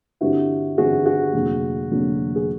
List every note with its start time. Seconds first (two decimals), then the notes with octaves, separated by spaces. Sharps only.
0.21 G2 D3 G3 C4 E4 F#4
0.78 G2 D3 G3 C4 F#4 G#4
1.06 F#4 G#4
1.33 F1 F2 D3 F#3 A#3
1.90 F1 F2 D3 F#3 A#3
2.36 G#4